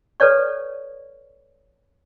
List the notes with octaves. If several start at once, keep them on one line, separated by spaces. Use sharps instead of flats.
A4 B4 C#5 D5 C#6